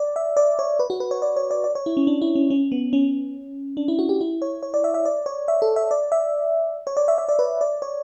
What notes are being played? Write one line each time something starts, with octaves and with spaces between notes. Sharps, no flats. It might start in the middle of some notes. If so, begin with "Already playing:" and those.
Already playing: D5
E5
D5
C#5
B4
F#4
B4
C#5
D5
C#5
D5
D5
C#5
E4
C#4
D4
E4
C#4
C#4
B3
C#4
D4
E4
F#4
G4
E4
C#5
C#5
D5
E5
E5
D5
C#5
E5
A4
E5
D5
E5
C#5
D5
E5
E5
D5
B4
D5
C#5